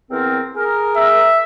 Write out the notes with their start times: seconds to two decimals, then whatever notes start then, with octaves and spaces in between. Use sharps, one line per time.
0.11 E2 C4 A#4
0.56 G#4 A#4
0.97 E5